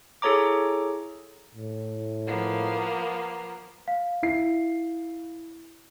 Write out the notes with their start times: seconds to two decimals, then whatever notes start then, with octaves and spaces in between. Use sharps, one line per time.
0.22 E4 G#4 A4 C#5 A#5 D6
1.55 A2
2.26 F3 A#3 B3
3.88 F5
4.23 E4 C7